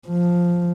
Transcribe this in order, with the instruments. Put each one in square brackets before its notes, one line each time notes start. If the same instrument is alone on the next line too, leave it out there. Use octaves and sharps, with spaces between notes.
[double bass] F3